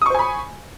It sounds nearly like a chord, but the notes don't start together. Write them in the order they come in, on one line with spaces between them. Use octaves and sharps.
D#6 C#6 C5 G#5 B5